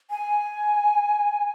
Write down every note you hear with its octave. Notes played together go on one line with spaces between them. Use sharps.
G#5